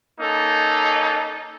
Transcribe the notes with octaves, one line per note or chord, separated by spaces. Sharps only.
A#3 C#4 D#4 A4